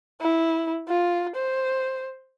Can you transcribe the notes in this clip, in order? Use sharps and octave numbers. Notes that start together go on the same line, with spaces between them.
E4
F4
C5